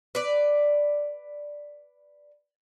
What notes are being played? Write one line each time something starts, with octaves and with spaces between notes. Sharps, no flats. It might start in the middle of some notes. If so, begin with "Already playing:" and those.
B4 D5